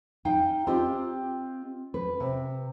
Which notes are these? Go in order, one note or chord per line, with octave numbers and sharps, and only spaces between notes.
D#4 F5 G5
C4 F4 G4 D#5 G5
B4
C3